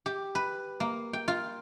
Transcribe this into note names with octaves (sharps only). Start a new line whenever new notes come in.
G4
B4
A#3
G5
F4